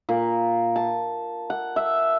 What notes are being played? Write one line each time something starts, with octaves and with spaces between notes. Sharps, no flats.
A#2
A5
F#5
E5